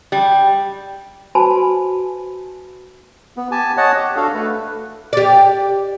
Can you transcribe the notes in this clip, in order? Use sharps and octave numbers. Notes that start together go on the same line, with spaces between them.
G3
F#4 B4 C5 G#5 A5 B5
B3
G4 G#5 A5
C#5 D#5 F#5 A5
G4
D4 F#4 A4 F5
A3 B4
G4 D5